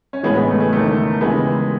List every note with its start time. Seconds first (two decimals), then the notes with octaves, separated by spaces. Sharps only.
0.13 C#4
0.23 A1 A2 E3 G#3 B3
0.35 G#3 B3
0.48 A3
0.60 G#3
0.73 F#1 E2 D#3 A3
1.21 D#2 C#3 E3 G#3 B3